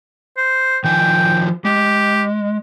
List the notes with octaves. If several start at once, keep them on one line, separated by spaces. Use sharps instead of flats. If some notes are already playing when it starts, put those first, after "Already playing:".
C5
D#3 F3 G5 G#5
G#3 G4